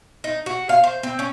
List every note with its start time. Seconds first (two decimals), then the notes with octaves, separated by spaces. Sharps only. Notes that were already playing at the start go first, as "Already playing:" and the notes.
0.24 D#4
0.46 F#4
0.69 F5
0.84 C5
1.03 C4
1.19 C#4